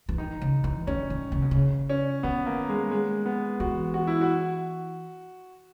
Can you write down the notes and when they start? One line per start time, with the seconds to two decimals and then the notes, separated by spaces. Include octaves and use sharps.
0.09 E3
0.18 D#3 D#4
0.41 C#3
0.64 E3
0.87 D#3 C#4
1.10 D#3
1.32 C#3
1.42 B2
1.51 C#3
1.89 C#4
2.23 D#3 B3
2.46 A#3
2.69 G#3
2.91 G#3
3.25 B3
3.60 E3 F#4
3.94 F#4
4.07 E4
4.21 F#4